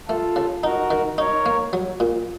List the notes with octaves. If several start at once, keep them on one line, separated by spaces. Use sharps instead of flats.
A3 F4 A4
C#3
D#4 F#4 A#4
D#3
D#4 A#4 C#5
A#3
F#3
A#2